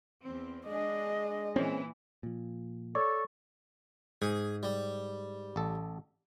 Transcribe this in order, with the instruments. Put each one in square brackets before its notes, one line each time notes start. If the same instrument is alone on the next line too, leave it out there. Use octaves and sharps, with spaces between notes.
[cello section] E2 C4
[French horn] G#3 [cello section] D4 G#4 [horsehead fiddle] D#5
[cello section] A#2 E3 E4 [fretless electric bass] C4 C#4
[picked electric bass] A#2 F3
[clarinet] A4 [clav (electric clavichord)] C#5 D5 [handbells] C#6
[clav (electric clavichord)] G#2 [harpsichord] G#4
[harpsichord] G3
[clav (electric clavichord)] A1 A4